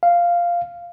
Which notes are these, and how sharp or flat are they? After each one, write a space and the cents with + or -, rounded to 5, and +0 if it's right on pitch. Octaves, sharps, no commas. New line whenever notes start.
F5 -5